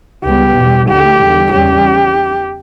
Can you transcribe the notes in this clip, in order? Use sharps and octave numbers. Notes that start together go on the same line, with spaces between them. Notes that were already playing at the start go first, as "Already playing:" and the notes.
C#2 C#3 G3 B3 G4
E2 B2 G3
D2 D3 A3 G4
E2 D3 G3
E2 C#3 G3 C#4 G4